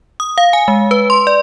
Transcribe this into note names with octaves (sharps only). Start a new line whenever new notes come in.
D#6
F5
G#5
G#3
B4
C6
D5